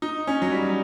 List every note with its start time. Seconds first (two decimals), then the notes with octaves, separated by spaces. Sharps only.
0.02 D#4
0.27 C#4
0.42 F#3
0.52 G3